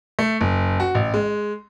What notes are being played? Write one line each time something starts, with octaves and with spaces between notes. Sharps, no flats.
A3
F#1
F#4
A1
G#3